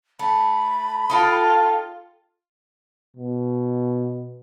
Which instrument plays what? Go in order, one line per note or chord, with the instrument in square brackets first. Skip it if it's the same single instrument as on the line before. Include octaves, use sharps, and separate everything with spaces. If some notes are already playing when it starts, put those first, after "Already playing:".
[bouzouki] A3 [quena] B5
[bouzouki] D#4 A4 G5 [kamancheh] F4
[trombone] B2